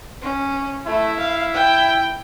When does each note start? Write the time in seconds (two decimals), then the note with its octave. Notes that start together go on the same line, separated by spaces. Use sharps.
0.22 C#4
0.87 A3 E4
1.20 F5
1.55 G5